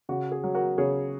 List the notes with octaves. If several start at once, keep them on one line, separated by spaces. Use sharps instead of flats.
C#3 F#4
G#4
F#3
F#4 A#4
C#3 G#4 C#5